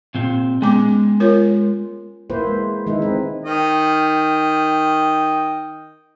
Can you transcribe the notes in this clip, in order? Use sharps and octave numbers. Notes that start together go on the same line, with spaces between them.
A#2 C4
G#3 B3 C#4 D6
F4 A#4 C#5
A#3 E4 B4 C5
G#3
D#3 G#3 D#4 E4 B4
C4 B4
D#3 D#5 G5